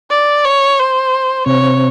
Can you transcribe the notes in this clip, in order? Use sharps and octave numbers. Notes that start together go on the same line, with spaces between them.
D5
C#5
C5
C3 C4 C#5